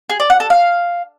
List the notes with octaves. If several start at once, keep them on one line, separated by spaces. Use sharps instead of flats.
G#4
D5
F#5
A4
F5